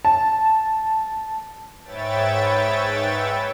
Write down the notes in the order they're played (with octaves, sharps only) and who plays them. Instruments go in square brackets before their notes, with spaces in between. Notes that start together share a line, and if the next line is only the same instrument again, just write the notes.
[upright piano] A5
[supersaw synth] G#2 B4 C#5 E5 G5 A6